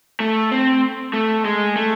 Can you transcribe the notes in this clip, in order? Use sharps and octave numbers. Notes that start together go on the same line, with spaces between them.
A3
C4
A3
G#3
A3